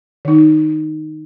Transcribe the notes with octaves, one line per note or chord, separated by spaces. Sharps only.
D#3 D#4